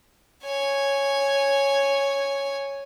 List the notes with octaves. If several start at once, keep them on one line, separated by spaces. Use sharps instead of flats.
C#5 G#5